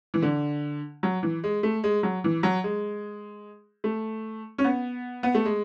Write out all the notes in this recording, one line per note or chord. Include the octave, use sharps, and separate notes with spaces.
E3
D3
F#3
E3
G#3
A3
G#3
F#3
E3
F#3
G#3
A3
C#4
B3
B3
A3
G#3